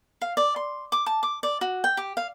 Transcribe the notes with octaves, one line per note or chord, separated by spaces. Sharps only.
F5
D5
C6
D6
A5
D6
D5
F#4
G5
G4
F5